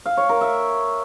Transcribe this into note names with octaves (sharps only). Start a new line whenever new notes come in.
F5
C#5
A#4
E5